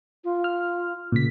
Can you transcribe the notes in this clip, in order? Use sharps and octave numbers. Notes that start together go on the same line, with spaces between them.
F4
F6
A#2 C#3 B6